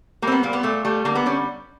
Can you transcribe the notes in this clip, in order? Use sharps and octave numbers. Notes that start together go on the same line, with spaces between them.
G3 A#3 C4
B3
A#2 A#3
B3
A#2 A3
G3 A3
D3 A#3
B3
G3 C#4